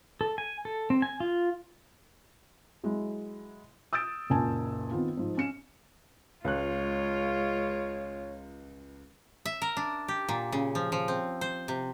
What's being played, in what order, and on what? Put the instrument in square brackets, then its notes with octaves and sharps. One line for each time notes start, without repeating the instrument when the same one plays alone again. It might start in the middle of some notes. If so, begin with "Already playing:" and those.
[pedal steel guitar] A4
G#5
A4
C4
G#5
F4
[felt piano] F#3 G#3 E4
D#6 E6 G6 A6 D7
F#1 C#2 A#2 G#5 A5
D#3 B3 C4 F4
G#2 F3
C#4 C#7 E7
[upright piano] C#2 F#6 [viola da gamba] G#3 F4 [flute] C#5
[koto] E5
A#4
D4
G4
A#2
C#3
F3
F3
C4
C5
C3